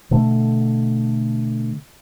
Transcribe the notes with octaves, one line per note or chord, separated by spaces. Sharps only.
B2 D3 A3